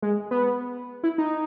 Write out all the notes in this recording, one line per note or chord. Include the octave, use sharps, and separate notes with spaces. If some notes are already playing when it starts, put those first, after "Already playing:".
G#3
B3
E4
D#4